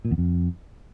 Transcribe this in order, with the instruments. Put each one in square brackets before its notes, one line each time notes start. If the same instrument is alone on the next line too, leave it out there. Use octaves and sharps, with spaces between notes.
[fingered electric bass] A#2
E2
F2